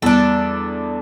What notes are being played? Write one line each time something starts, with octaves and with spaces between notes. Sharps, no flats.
E2 G3 B3 D4 A4